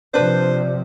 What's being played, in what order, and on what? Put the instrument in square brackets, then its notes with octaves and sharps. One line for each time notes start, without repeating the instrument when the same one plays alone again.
[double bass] C3 F3 [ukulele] D4 B4 [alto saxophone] C5 [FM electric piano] D5